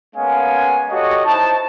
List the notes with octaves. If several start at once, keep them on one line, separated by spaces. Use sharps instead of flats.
G#3 A#3 B3 C#4 F5 G#5
F#4 G4 A4 C#5 D#5
D#4 E4 C5 A5